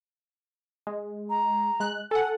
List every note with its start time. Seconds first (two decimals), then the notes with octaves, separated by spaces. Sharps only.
0.87 G#3
1.30 A#5
1.80 G#3 F#6
2.11 A4 F#5 G#5